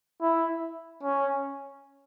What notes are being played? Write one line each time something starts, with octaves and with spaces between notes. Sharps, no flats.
E4
C#4